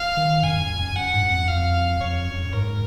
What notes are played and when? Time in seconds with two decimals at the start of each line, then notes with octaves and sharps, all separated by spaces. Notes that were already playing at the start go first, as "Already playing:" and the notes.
Already playing: F5
0.17 D#3
0.43 F#2 G#5
0.56 F#2
0.70 F#2
0.83 F#2
0.96 F#2 F#5
1.14 G#2
1.22 F#2
1.30 F2
1.48 F2 F5
2.01 F2 C#5
2.27 F#2
2.46 F#2
2.53 G#2 A#4